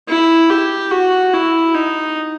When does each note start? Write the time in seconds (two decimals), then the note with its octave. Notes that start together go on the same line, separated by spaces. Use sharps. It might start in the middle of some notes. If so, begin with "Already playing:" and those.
0.09 E4
0.50 G4
0.91 F#4
1.33 E4
1.74 D#4